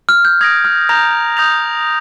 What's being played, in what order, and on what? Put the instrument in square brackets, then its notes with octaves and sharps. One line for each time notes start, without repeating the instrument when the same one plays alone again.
[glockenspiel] F6
G6
[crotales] D#6 G6 A#6 D7 [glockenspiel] G#6
[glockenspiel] F6
[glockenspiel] A#5 [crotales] D#6 G6 A#6 F7
[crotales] D#6 G6 A#6 F7